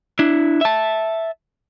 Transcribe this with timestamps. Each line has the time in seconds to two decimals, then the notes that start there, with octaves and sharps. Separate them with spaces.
0.19 D4 E4
0.61 E5 A5